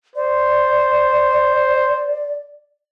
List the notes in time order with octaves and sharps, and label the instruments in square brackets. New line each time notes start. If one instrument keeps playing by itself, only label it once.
[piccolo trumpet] C5 [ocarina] D5